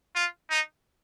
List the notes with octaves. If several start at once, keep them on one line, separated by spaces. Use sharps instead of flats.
F4
D#4